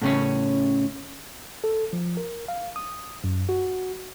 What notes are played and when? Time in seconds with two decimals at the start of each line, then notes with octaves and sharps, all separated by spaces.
0.02 A2 C#3 C#4
1.64 A4
1.93 F3
2.17 A#4
2.48 F5
2.76 D#6
3.24 F#2
3.49 F#4